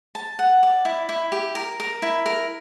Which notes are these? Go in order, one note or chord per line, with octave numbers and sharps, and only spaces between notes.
A5
F#5
D5
E4
E4
G4
A#4
A#4
E4
A#4